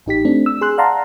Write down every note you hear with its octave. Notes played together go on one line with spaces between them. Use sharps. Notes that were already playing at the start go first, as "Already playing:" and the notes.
A1 D#4 G4 B6
A3 C4 D4
E6
G#4 C6 F#6
D5 F5 F#5 A5 A#5 C6